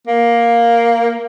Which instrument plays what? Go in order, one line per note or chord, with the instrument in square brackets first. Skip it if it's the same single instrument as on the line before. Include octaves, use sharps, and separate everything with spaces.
[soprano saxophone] A#3